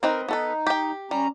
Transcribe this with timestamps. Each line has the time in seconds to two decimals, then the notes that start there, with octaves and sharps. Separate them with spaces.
0.03 C4 D#4 A#4 B4
0.28 B3 D#4 A4 B4
0.67 G4 G5
1.11 G3 C#4 A#5